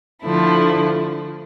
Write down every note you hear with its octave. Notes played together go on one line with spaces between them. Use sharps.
D3 F3 A3 E4